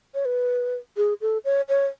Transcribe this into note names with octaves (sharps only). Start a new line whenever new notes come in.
C#5
B4
G#4
A4
C#5
C#5